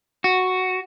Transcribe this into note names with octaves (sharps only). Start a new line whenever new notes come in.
F#4